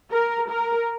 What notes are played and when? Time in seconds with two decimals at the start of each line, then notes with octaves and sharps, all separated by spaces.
0.11 A#4
0.50 A#4